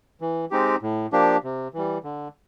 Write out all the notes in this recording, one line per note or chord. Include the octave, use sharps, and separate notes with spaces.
E3
G#3 C4 D#4 G4
A2
F3 A#3 D4 G4
C3
E3 G3
D3